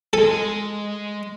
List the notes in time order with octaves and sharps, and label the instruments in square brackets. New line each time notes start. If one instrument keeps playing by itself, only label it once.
[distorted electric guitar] G#3 G#5 [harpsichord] A4